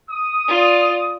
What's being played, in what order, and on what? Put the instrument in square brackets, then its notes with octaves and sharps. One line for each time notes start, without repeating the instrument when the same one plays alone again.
[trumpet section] D#6
[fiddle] F4 D5